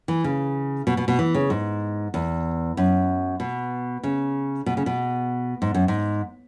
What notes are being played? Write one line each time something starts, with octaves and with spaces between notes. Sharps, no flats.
E3
C#3
B2
B2
B2
E3
C#3
G#2
E2
F#2
B2
C#3
B2
C#3
B2
G#2
F#2
G#2